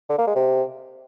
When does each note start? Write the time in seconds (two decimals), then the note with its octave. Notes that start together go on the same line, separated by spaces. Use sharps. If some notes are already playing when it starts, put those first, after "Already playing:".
0.10 D3
0.18 A#3
0.27 G#3
0.36 C3